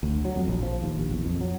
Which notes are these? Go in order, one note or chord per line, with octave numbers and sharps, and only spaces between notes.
D2
F#3
F2
A#1
F3
D#2
A#1
E2
F2
F#3